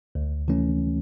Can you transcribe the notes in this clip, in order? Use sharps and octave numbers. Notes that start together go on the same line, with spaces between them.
D2
C3 E3 A3 C#4